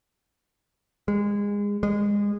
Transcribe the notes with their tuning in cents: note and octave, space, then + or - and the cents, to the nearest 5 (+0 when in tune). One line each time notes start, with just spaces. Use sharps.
G#3 -25
G#3 -25